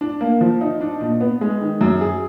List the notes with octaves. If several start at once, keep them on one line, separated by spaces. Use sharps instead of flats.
D4
A#3
F3
D#4
D4
A#2
B3
G#3
D#3
F#2
G#4